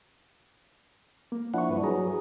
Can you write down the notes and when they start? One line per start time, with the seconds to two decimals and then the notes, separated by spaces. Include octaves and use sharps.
1.32 A#3
1.54 F3 D4 E4 F#5 C#6
1.69 D2 G2 B4
1.84 F#3 G#4 A#5